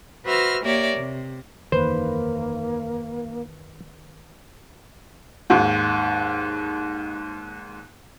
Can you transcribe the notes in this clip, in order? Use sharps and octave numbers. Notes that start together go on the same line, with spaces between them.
F#4 B4 C5 E5 F6 A#6
A#3 G4 A#4 C#5 D5 E5
C3
F#1 E2 D#3 A#3 B4 C5
D#2 G#2